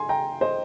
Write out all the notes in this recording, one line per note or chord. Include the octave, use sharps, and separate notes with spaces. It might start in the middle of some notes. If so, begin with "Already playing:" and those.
Already playing: G#5 C6
G5 A#5
C5 D#5